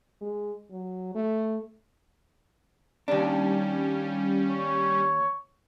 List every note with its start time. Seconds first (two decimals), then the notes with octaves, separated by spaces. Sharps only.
0.21 G#3
0.71 F#3
1.15 A3
3.08 D#2 G3 C#4 D4
4.50 C#5